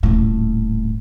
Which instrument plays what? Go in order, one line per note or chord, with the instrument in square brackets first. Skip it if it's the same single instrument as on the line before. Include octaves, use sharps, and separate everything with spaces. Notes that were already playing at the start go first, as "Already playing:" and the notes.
[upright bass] D#1 A2